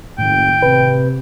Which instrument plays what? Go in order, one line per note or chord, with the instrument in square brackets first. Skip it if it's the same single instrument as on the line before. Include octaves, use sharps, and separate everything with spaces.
[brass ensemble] F#1 [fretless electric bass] A2 D#3 A3 [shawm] G5
[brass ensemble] C3 [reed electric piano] B4